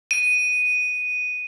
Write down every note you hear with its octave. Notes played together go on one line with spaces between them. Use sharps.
D#7